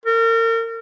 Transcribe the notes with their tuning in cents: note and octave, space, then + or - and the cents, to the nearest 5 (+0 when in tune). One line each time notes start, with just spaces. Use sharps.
A#4 -35